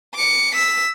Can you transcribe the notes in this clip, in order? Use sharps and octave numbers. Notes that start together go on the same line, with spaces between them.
D6 C#7
E6 B6